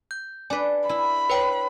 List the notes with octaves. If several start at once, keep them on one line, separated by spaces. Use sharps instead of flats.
G6
D4 B4 G#5 D6
E4 B5
B4 C#5 G5